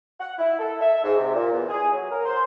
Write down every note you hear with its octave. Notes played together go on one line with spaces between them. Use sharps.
F#5
E4
A4
E5
G#2
C3
A#2
E2
G#4
F#3
A#4
C5